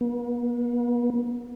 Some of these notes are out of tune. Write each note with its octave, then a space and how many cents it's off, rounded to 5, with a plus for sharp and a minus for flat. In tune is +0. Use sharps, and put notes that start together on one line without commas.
B3 -45